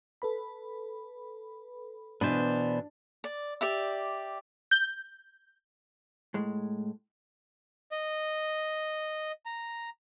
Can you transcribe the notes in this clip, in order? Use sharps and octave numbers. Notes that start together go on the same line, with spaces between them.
A4 B4 B5
B2 E3 B3 D4 C5
D5
G4 D5 E5
G6
A2 G#3
D#5
A#5